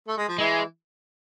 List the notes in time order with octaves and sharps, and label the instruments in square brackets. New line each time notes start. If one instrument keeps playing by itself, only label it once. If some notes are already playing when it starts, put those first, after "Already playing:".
[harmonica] A3
G#3
F3
[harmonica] E3 [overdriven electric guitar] G#3